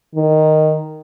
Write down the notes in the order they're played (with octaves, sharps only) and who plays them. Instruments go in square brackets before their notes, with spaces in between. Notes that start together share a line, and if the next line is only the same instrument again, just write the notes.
[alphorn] D#3